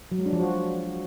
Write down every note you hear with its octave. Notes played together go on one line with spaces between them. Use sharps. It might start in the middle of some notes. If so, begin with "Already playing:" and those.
F#3
G#3
D4
F3
F#4